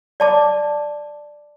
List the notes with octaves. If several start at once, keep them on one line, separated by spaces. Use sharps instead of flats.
D5 A5 D6